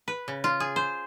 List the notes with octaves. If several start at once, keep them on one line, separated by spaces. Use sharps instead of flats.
B4
C#3
F4
G#4
C5